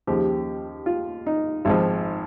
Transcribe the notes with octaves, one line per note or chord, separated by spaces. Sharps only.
D#2 C#3 F3 G4
F4
D#4
G#1 G#2 F3